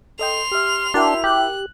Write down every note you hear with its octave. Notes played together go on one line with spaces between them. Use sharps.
A4 D#5 G5 C6 F7
G4 E5 F6
D4 E4 F#4 A#4 G5
G4 F#6